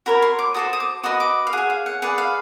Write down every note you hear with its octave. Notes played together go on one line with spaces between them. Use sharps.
F#4 A#4 C#5 B5
C6
D6
F#4 A4 C5 D#6
D#6
D6
F#4 B4 D#5 D#6
D6
F5
G#4 C#5 F#5
F5
F#5
G#4 B4 D5 F#5
F5